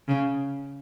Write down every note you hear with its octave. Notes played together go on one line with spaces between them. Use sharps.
C#3